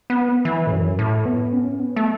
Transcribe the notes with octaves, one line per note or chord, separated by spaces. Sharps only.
B3
E3
A2
F#2
A2
B3
C#4
B3
A3